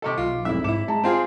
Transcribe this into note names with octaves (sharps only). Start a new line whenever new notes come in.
C3 A4 D#5 C#6 D6
B1 F4
F1 G#2 E4 E5
G#2 E4 D6 E7
G#3 A5 A#5
C4 F4 G#4 C5